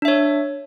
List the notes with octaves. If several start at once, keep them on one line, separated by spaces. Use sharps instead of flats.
D4 C#5 E5